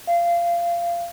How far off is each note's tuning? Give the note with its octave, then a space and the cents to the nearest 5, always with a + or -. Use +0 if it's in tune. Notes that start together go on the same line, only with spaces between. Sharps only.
F5 -20